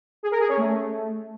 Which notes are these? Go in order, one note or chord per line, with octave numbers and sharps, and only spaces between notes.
G#4
A#4
G#4
C#4
A3